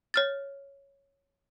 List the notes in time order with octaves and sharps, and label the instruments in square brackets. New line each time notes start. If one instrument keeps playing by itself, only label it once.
[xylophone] C#5 F6 A6